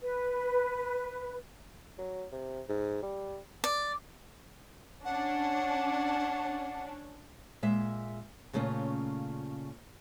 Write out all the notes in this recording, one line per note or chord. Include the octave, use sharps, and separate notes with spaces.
B4
F#3
C3
G#2
G3
D5
C#4 D4 F#5
A#2 G#3 E5
A#2 C#3 A3 C#4 F4